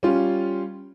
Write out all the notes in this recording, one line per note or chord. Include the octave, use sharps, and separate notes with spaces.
G3 C#4 F4